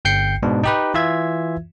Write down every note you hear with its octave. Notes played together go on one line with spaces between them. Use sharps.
G1 G5 G6 C7 C#7
G#2 B2 D4
D#4 G4 B4
E3 F4 E5 G#6